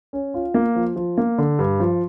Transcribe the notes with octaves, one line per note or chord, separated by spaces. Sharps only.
C#4
F4
A#3
F3
F3
A#3
D3
G2
F3